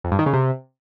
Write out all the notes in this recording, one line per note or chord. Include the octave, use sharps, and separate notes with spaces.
F2
G2
D#3
C#3
C3